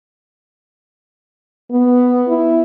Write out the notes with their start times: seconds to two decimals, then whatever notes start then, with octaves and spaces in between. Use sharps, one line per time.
1.71 B3
2.28 E4